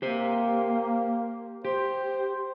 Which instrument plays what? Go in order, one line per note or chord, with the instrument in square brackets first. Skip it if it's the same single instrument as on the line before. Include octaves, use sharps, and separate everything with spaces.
[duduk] A#3 [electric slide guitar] G4 C5
[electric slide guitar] G4 [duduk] C5